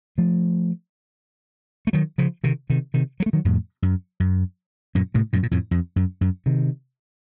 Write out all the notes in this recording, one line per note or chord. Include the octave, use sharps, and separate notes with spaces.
F3 A3
A3
D#3 F#3
C#3 F3
C3 D#3
C3 D#3
C3 D#3
F#3
A3
D#3 F#3
F2 A2
F#2
F#2
F#2 A#2
A2 C3
F#2 A#2
A#2
F2 A2
F2
F#2
F#2
C3 D#3